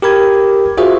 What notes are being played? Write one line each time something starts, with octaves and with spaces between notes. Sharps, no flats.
G4 A#4 B5 G#6
F4 F#4 G#4 C5 E5